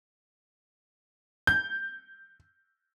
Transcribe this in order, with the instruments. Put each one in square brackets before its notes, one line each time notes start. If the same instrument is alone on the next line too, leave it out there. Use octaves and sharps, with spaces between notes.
[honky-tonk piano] G6